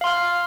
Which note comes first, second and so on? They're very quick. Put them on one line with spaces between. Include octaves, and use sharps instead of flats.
F5 C6 F6